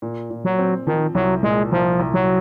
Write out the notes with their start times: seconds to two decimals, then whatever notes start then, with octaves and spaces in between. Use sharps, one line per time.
0.02 A#2
0.30 A#2
0.45 F#3
0.59 C4
0.87 D#3 F3
1.15 C2 F#3
1.43 A#2 G#3
1.72 C2 F3
1.99 C2
2.14 F#3